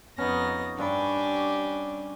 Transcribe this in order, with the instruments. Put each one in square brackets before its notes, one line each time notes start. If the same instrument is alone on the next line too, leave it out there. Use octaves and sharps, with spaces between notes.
[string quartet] F2 B3 A#6 [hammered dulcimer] C#4 D#4
[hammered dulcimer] G2 C#5 B5 [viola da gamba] D4 [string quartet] G4 G#5